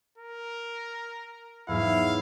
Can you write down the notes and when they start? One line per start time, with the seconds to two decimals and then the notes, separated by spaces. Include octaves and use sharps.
0.18 A#4
1.68 E2 G#2 F#3 E4 F5